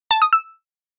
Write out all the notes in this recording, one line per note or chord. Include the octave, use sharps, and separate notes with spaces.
A5
D#6
E6